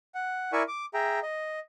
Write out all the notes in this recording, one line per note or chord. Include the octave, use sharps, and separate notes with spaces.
F#5
E4 A#4 D5 E5 G#5 C#6
D6
G#4 E5 G5 A#5
D#5